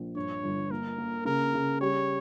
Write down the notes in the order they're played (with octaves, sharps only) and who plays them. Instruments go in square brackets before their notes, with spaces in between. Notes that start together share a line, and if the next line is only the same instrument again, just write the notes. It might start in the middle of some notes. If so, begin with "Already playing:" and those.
Already playing: [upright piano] A#1
[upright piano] G2 [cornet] C#5
[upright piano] G1
[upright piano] A#3 [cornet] A#4
[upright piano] A#3
[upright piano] C#3 [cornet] A#4
[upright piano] C#3
[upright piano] G3 [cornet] C#5